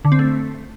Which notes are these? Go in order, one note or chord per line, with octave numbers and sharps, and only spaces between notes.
D3
C4
A3